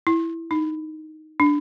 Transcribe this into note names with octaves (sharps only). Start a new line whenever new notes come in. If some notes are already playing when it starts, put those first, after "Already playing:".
E4
D#4
D4